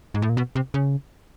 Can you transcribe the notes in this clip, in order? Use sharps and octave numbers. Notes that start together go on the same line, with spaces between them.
G#2
A2
A#2
B2
C3
C#3